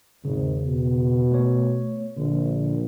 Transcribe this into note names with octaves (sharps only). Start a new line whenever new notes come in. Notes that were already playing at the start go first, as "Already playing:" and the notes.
G#1 E2 C#3
B2
A3 C#5
A#1 D3